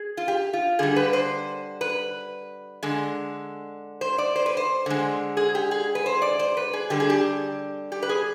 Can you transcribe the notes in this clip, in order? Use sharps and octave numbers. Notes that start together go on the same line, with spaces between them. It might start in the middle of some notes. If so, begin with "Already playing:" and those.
Already playing: G#4
F4
G4
F4
D3 G3 G#4
B4
C5
B4
D3 G#3
C5
D5
C5
B4
C5
D3 G#3
G#4
G4
G#4
B4
C5
D5
C5
B4
G#4
D3 G3 G4
G#4
G4
G4
B4
G#4